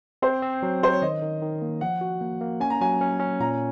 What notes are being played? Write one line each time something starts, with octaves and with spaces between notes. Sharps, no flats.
C4 C5
C4
F#3
F#3 C5
C#5
D#3 D#5
D#3
D#3
A#3
F3 F#5
F#4
A#3
A#3
C#4 G#5
A#5
F#3 G#5
C#4
C#4
A#2 A#5